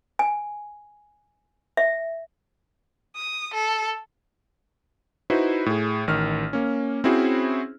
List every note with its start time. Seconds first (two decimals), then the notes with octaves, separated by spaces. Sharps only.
0.19 G#5
1.77 E5
3.16 D#6
3.54 A4
5.30 D#4 E4 F#4 B4 C5
5.66 A2 G#4
6.07 A1 D#3 F6
6.53 A#3 C#4
7.04 C4 C#4 E4 F#4 G#4 C5